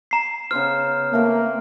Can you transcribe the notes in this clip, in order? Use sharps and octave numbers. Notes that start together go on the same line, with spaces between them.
A#5 C7
C#3 B3 C5 F6
A3 A#3 C4 A#4